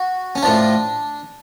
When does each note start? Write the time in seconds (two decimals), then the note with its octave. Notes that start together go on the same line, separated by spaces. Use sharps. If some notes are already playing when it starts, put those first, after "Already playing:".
Already playing: F#4
0.35 C#4
0.43 A2 F3 D4